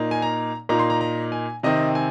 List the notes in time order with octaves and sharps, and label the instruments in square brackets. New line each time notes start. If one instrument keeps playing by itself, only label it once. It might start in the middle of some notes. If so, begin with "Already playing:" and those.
Already playing: [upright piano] A#2 A#3 D#4
G#5
A#5
A#2 A#3 D#4 A#5
C6
A#5
A#5
G#5
C3 D#3 C4 D#5
G#5